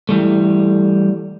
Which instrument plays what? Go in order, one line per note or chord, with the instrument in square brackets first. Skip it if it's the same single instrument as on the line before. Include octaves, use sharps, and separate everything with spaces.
[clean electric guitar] E3 G3 A3